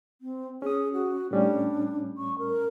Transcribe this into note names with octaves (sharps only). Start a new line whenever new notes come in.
C4
C#4 G#4 D#6
F#4
A2 G3 C#4 D4
C#6
A#4